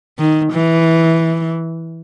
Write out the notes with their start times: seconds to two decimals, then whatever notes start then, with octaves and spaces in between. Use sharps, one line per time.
0.19 D#3
0.52 E3